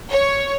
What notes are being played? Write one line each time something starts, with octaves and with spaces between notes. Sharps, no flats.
C#5